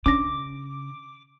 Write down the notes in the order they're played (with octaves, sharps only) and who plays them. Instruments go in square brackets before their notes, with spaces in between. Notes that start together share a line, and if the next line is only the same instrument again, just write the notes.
[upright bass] C#3 [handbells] C#4 D4 A#6 [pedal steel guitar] D6